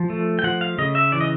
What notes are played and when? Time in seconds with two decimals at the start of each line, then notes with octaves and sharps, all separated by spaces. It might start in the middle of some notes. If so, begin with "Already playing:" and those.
Already playing: F3
0.10 A3
0.39 G5
0.44 F3 F#5
0.61 F5
0.78 C#3 D#5
0.95 E5
1.12 E3 D5
1.20 D#5